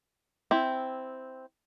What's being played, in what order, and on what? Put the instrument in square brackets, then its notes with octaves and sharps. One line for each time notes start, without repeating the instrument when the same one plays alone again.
[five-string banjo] C4 E4